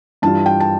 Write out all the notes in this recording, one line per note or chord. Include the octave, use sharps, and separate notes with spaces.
G2 E3 G3 D4 F4 A5
G5
A5